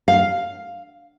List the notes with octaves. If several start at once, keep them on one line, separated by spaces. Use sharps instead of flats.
F5